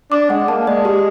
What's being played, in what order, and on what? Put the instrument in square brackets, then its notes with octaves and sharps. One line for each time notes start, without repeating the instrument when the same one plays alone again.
[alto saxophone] D4 [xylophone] D6
[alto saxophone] G#3 [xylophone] F#5
[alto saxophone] A#3 [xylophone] A5
[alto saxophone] G#3 [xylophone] D5
[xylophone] G4